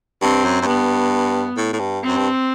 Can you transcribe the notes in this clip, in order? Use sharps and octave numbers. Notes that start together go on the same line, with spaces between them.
G2 C4
F#2
F#2
G2 B3
A2
A2
G2
C4
F#2
G2